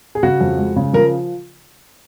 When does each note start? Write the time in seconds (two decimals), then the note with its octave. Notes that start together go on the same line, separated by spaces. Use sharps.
0.15 G#4
0.23 C#3 F#4
0.41 F2
0.58 G#3
0.76 C#3
0.93 F3 A#4